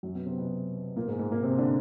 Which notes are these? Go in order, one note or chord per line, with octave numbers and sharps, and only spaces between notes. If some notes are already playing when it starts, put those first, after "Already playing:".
F#2 F#3
B2 B3
C3 C4
B2 B3
A#2 A#3
G#2 G#3
G#2 G#3
A#2 A#3
C3 C4
D3 D4